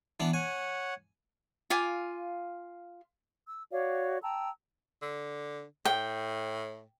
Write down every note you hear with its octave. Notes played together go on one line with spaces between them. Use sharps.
E3 B3 D4
C#5 F#5 G#5
F4 F5 G#5 D6
E6
F#4 C#5 D5 F5
G5 A5 A#5 E6
D3
A2 G5